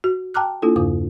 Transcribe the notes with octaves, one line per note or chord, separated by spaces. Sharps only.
F#4
G5 A5 A#5 D6 F6 F#6
A#3 D4 E4 F4 A4
E2 G2 C#3 D#6